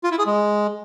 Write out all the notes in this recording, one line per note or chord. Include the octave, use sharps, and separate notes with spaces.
F4
E4
G#4
G#3